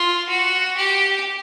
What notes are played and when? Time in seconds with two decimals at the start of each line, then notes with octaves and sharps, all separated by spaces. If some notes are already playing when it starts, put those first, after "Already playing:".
Already playing: F4
0.29 F#4
0.77 G4